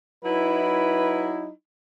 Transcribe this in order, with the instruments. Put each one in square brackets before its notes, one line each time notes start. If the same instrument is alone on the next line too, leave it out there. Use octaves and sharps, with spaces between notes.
[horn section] F#3 D#4 E4 [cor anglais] B4